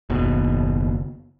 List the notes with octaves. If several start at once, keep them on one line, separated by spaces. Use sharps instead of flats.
F#1 D#2 B2